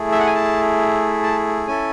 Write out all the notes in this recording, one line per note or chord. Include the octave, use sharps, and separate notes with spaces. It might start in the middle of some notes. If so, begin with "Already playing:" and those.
Already playing: A3 E4 G#4
E5
F#5
G#5
A5
A5
C#4 E4 A4 G#5